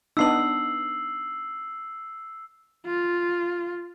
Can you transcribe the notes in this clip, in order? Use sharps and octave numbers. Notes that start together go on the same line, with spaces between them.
B3 D4 D#4 E6 C7 F#7
F4